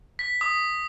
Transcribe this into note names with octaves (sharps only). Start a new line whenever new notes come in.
B6
D#6